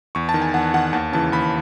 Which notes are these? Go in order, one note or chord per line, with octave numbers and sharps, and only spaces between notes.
E2 C#6
A5
D#3
G#5
E2 F#5
D#3 F#5
D#2 A5
C#3 E3 A5
D#2 B5